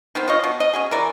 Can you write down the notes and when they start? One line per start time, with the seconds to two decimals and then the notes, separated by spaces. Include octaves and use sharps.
0.15 D#3 B3 C4
0.28 F4 C#5 D#5
0.44 B2
0.60 D#5
0.73 C#4 F#4 G#4
0.91 E3 A#4 D5